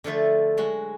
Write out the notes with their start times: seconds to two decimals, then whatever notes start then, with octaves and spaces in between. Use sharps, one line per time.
0.04 D3 F3 A3 E5
0.57 F#3 G#3 F#4